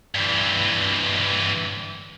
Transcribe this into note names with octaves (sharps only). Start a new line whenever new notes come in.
G2 E3